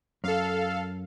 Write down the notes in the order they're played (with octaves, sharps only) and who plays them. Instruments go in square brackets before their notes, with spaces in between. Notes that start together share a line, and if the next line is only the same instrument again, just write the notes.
[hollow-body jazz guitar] F#2 [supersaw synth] A4 F5